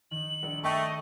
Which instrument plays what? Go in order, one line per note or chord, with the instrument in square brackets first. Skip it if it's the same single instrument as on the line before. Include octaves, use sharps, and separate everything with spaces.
[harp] D#3 D#4 [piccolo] F#7
[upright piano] A#1
[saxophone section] A3 [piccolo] D#5 [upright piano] G5 C#6